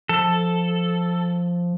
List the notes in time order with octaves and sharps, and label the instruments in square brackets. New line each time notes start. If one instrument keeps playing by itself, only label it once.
[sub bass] F3 [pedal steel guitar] A4